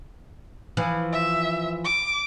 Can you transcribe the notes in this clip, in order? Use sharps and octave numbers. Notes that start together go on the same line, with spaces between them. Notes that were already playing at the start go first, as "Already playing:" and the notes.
E3 F3
E5
D6